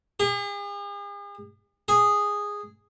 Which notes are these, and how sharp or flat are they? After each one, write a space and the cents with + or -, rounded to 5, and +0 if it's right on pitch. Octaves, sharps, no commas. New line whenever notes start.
G#4 -45
G#4 -10